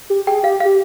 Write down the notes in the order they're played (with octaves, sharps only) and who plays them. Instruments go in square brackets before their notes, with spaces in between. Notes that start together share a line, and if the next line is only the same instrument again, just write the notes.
[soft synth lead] G4
[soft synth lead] G#4 [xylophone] G5
[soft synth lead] G4 [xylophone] F5
[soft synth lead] G4 [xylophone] F5